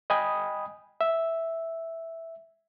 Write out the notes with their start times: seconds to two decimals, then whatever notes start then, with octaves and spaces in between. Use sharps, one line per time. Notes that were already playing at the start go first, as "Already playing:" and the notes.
0.10 D#5 G5 G#5 B5 D#6
1.01 E5